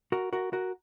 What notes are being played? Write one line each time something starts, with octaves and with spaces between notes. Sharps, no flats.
F#4 A#4
F#4 A#4
F#4 A#4